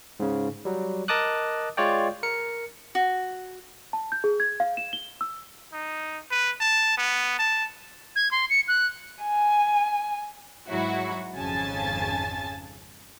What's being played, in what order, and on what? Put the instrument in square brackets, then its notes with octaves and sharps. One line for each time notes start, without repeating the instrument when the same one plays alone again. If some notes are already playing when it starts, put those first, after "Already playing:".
[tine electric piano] G#2 C#3
F#3 G3
A#4 D#5 A5 D6 D#6 F#6
G#3 F4 C#5 D5 G5
A#4 C#7
[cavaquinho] F#4
[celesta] A5
G6
G#4
G#6
F5
E7
G7
E6
[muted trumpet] D#4
B4
A5
B3
A5
[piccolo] G#6
C6
C#7
F#6
[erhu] G#5
[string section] G#2 F#3 E4 F#4
G#1 F2 C#3 G#5 A5 A6